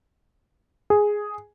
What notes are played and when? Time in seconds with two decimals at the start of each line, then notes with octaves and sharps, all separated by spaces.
0.90 G#4